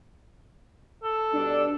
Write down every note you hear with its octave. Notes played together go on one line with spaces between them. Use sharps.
A4
B2 G3 D4